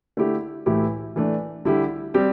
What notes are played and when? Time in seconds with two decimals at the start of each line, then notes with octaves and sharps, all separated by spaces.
0.17 D3 A3 E4 G4
0.66 A2 E3 A3 E4 G4
1.16 E3 A3 D4
1.65 D3 G3 E4 G4
2.14 G3 C4 G4